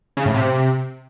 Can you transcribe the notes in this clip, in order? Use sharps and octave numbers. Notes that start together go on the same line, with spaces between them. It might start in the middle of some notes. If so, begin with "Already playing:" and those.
C#3
A2
C3